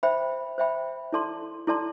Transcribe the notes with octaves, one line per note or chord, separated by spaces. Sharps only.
C5 E5 G5 B5
C5 E5 G5 B5
E4 A4 D5 A5 C6
E4 A4 D5 A5 C6